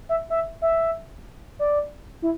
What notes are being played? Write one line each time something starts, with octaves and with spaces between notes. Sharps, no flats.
E5
E5
E5
D5
E4